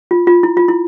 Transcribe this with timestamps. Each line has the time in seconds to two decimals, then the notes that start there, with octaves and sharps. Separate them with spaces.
0.11 F4
0.27 F4
0.43 E4
0.57 F4
0.68 E4